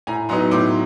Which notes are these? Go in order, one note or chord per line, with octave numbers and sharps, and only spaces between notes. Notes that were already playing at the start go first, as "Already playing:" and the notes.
A2 G#5 A#5
F#3 B3 D#4 A#5 C6
A2 C6 D6